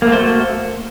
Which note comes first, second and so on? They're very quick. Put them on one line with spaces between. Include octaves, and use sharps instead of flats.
A#3 A3 C5 F#4